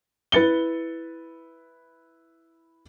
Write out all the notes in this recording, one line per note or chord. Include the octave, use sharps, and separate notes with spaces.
E4 B4 A6 C#7 G7